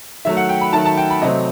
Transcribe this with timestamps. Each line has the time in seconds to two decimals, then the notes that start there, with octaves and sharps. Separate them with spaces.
0.25 D#3 F#3 A3 E5
0.37 F#5
0.49 G5
0.61 B5
0.73 D#3 F#3 A3 A5
0.85 A5
0.97 G5
1.10 B5
1.22 C3 F#3 A3 C4 D#5